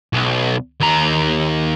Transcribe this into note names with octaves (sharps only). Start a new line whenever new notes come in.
B1
D#2 A#5